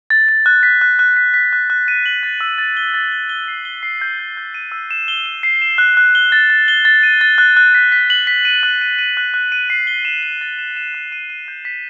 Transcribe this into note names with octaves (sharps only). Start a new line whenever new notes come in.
A6
A6
F#6
B6
F#6
F#6
B6
B6
F#6
F#6
D#7
F#7
A6
E6
A6
G7
A6
G7
G7
C7
G7
C7
G6
G6
G6
D#7
E6
E7
G7
E7
C7
E7
F#6
F#6
G7
A6
A6
G7
A6
D#7
A6
F#6
F#6
B6
B6
F#7
B6
D#7
F#6
D#7
D#7
F#6
F#6
D#7
C7
G7
E7
E7
A6
E7
E7
F#6
D#7
D#7
G6
B6